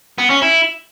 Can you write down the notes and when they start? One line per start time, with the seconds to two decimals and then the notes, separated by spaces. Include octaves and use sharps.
0.18 B3
0.30 C#4
0.42 E4